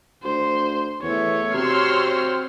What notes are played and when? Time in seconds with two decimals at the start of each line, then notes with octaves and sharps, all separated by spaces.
0.23 D2 C5
1.03 E2 A3 C#5
1.54 C3 C4 F#4 C6 E6 F6